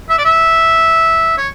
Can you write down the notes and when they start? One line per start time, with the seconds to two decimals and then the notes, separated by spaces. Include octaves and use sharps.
0.09 E5
0.18 D5
0.25 E5
1.38 C#5